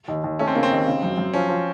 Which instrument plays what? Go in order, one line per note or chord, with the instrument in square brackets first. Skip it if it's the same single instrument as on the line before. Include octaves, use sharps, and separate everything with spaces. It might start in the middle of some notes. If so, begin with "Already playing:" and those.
[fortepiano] D#2
D#2
[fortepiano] A3 [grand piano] C#4
[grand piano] C4
[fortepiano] C#3 [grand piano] A#3
[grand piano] C4
[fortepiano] D#2
C#3
F#2
F#2
[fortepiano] F3 [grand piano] C#4
[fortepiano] F3